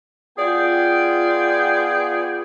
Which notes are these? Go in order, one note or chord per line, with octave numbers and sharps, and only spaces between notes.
B3 F4 G#4 D5 G5